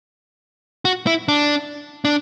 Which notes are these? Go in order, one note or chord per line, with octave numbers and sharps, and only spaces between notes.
F#4
E4
D4
D4